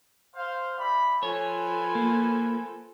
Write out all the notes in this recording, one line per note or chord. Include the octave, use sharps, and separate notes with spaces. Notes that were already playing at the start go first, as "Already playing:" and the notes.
C5 F5
G3 E5 B5
F3 A4 B4 C#5 G#5
A#3